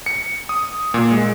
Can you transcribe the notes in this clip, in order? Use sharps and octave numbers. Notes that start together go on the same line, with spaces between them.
C#7
D#6
A#2
G#3